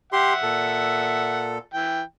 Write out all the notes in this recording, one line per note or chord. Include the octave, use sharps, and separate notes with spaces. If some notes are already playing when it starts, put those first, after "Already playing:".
G4 E5 F#5 C6
A#2 A4
E3 G5